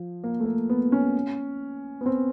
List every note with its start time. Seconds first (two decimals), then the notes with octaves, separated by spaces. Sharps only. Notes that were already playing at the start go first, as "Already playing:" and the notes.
Already playing: F3
0.24 A#3
0.40 A3
0.45 A#3
0.69 B3
0.92 C#4
2.01 B3
2.06 C4